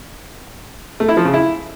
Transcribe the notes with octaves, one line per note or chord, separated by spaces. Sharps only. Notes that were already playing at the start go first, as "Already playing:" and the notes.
A3
E4
F3
C#3
E4